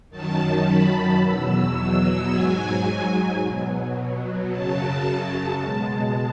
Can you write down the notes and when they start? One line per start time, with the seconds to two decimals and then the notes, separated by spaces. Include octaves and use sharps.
0.10 F#2 D#3 F#3 A5
0.65 B5
1.20 E2 B2 F#3 E6
2.30 G#2 F#3 G#5
3.40 B2 F#3
4.50 F#2 C#3 F#3 A5
5.59 B2 G#3